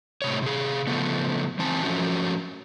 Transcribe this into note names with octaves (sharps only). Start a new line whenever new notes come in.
A2 C3 C#5
C3 G#4
C#3 F3 A3 B3
E3 C4 G#5 A5
F3 F#3 A3 C#4 F#4